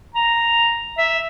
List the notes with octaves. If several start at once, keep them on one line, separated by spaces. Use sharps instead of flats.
A#5
E5